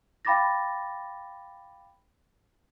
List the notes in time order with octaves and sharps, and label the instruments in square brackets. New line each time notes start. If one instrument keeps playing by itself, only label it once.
[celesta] F5 G5 B5 D6 A6 A#6